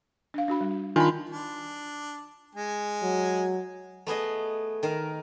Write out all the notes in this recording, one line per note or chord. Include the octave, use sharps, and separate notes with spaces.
D4 F5
D4 F#4 B5
G3
D#3 D4 F4 G#5 B5 C6
D4
G#3 G#5
F#3
A3 B3 G#4 D#5
D#3 A#4